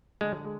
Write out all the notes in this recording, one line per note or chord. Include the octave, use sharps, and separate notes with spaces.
D3 G#3
G#3